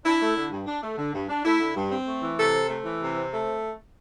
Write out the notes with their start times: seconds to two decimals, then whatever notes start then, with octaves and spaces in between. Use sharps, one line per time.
0.04 D4 E4
0.20 A3
0.35 D3
0.51 G2
0.67 D4
0.82 A3
0.98 D3
1.13 G2
1.29 D4
1.44 A3 E4
1.60 D3
1.76 G2
1.91 C4
2.07 A3
2.22 E3
2.37 C3 A4
2.54 C4
2.69 A3
2.84 E3
3.00 C3
3.16 C4
3.31 A3